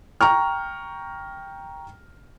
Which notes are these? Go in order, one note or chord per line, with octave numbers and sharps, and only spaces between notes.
G5 A#5 C#6 F6